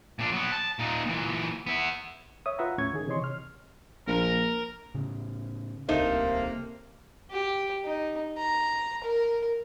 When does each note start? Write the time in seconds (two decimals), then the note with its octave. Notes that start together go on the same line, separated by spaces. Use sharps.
0.19 A#2 D4
0.32 F#3 B3
0.52 A5
0.79 A#2 D#4
1.06 A#2 E3
1.67 B3 E4
2.46 C#5 E5 D#6
2.58 F4 B4 E5 F#5 A#5
2.78 D#2 A2 C#4 C#6 G#6
2.93 D#3 G#4
3.08 C3 E3 C#5 D#5 C6 C#6
3.24 F6
4.07 A#1 A#4
4.94 A2 C#3
5.89 D#1 C#2 C3 A3 A#3 D#4 C5
7.31 G4
7.85 D#4
8.38 A#5
9.04 A#4